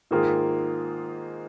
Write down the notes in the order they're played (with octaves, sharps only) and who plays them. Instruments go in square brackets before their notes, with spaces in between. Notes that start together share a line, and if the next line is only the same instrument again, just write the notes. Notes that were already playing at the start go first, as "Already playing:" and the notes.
[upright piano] G#2 D#3 A#3 F4 G#4